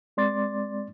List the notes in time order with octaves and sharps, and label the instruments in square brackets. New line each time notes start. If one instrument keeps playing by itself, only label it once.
[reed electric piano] G#3 C4 D5 C6 D6 A6